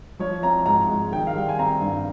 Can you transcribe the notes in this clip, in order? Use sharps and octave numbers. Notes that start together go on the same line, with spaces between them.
F3 C#5
C4 A#5
G#2 A#5
G#2
D#3 G5
F5
G3 G5
G#5
C4 A#5
G2